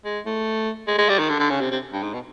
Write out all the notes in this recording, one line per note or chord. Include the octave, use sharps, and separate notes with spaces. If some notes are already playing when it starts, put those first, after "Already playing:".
G#3
A3
G#3
G#3
G3
D#3
D3
D3
C#3
C3
C3
G2
G#2
B2